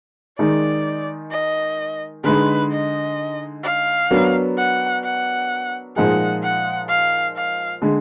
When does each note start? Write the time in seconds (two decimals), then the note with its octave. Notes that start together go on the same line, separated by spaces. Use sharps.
0.38 D#3 G#3 D#4 D5
1.31 D#5
2.24 D3 G#3 D#4 B4
2.72 D#5
3.64 F5
4.10 F#3 B3 D4 F#4 A#4
4.57 F#5
5.04 F#5
5.96 A#2 F3 G#3 D#4 G#4 F#5
6.43 F#5
6.88 F5
7.36 F5
7.82 D3 G#3